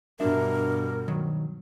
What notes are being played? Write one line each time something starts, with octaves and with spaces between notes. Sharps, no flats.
G2 B2 D4 A#4 E5
D#3 F#3